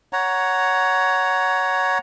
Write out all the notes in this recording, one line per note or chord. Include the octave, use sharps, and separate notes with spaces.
C#5 F#5 A#5